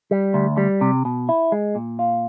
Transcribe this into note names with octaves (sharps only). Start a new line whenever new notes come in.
G3
D2
G3
C3
B2
E4
G#3
A#2
F4